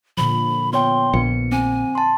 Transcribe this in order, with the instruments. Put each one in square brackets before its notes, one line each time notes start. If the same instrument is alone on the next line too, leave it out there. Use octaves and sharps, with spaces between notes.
[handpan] A#2 D3 F3 [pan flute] B5
[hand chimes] B3 C#5 G5 [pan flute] C6
[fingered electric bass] A#1 [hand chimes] B3 C#7
[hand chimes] C4 [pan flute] G#5
[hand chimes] A5 C6